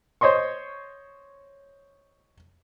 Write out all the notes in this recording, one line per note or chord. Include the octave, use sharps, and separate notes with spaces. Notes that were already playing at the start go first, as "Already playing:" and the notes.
C5 C#5 D#5 C6 C#6